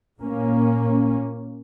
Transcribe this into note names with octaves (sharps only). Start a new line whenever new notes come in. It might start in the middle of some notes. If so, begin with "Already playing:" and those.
A#2 A#3 C#4